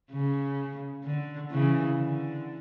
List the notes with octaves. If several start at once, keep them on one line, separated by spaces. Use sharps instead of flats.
C#3
D3
C#3 E3
D3